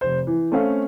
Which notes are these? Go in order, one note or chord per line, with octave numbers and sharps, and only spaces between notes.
F1 C5
E3
A3 C4 C#4 A4 F5